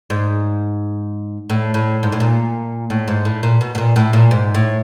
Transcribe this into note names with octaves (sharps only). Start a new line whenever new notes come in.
G#2
A2
A2
G#2
A2
A#2
A2
G#2
A2
A#2
B2
B2
A#2
A2
A#2
G#2
A2